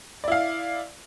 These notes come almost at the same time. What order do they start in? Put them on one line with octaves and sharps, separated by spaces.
D5 E4 F5